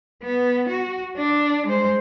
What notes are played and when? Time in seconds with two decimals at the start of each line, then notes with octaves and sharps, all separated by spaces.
0.23 B3
0.69 F#4
1.17 D4
1.67 G#3 C5